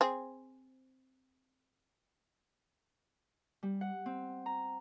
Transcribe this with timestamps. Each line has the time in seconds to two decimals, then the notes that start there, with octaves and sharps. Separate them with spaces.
0.01 C4 G#4
3.63 G3
3.81 F#5
4.06 C4
4.46 A#5